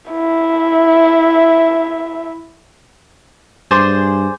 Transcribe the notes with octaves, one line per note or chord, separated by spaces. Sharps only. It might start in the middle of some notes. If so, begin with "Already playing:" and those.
E4 E5
G2 G#4 C5 D5